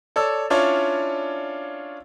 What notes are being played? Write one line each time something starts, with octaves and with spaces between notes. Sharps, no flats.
A4 C#5 D5 E6
C#4 D4 E4 F4 C#5 D5